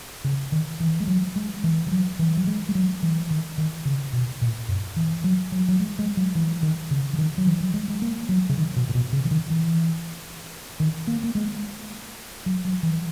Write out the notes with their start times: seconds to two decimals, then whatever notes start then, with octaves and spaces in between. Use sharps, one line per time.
0.24 C#3
0.52 D#3
0.80 E3
1.00 G#3
1.07 F#3
1.36 G#3
1.64 E3
1.87 E3
1.91 F#3
2.19 E3
2.37 F#3
2.47 G#3
2.69 G#3
2.75 F#3
3.03 E3
3.31 D#3
3.58 D#3
3.85 C#3
4.13 B2
4.42 A#2
4.69 F#2
4.96 E3
5.24 F#3
5.52 F#3
5.68 F#3
5.80 G#3
5.99 G#3
6.17 F#3
6.35 E3
6.63 D#3
6.91 C#3
7.13 E3
7.18 D#3
7.38 F#3
7.47 E3
7.60 F#3
7.74 G#3
7.88 G#3
8.02 A#3
8.29 F#3
8.49 C#3
8.57 D#3
8.76 B2
8.89 A#2
8.95 B2
9.13 C#3
9.25 E3
9.31 D#3
9.50 E3
10.80 D#3
11.07 A#3
11.24 A#3
11.35 G#3
12.46 F#3
12.65 F#3
12.83 E3